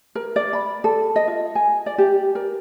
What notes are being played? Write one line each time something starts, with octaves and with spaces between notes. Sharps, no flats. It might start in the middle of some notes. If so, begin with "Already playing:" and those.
A#4
D5
B5
A4
D#5
F4
G#5
D5
G4
A#4